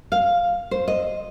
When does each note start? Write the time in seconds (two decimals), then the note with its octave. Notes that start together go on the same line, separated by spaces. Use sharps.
0.12 F5
0.71 C5
0.88 D#5